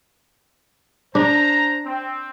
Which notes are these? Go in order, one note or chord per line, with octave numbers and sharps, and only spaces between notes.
D4 C5 A#5
C4